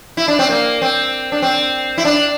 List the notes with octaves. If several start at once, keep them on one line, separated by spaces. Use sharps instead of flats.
E4
D4
C4
A#3
C4
D4
C4
E4
D4